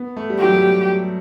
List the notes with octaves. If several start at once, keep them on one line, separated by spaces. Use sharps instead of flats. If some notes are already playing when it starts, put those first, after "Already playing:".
Already playing: B3
A3
G3
F#3 G4
G3